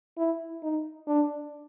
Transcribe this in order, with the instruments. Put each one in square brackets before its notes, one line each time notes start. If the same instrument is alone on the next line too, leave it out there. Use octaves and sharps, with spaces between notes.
[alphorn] E4
D#4
D4